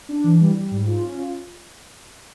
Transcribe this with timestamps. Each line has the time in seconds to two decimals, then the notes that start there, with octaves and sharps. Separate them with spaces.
0.09 D4
0.24 E3
0.40 G3
0.55 G3
0.71 G#2
0.86 F4
1.02 C#4
1.18 F4